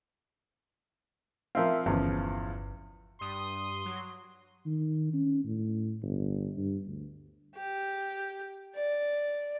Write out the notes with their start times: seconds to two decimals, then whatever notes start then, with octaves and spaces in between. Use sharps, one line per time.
1.55 F3 C4 A#4 E5 F5
1.86 G1 E2 C#3 F3
3.21 G2 C6 D#6
3.85 F#3
4.66 D#3
5.14 C#4
5.44 A2
6.02 G1
6.57 G2
6.86 D2
7.55 G4
8.75 D5